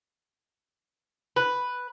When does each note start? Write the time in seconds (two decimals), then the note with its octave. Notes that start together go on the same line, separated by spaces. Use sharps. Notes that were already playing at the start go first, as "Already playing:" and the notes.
1.36 B4